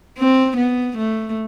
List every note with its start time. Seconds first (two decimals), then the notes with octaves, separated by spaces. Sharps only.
0.18 C4
0.57 B3
0.98 A3